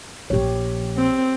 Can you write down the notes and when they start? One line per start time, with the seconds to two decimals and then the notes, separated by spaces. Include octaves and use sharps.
0.30 A#1 F3 G4 C#5
0.97 C4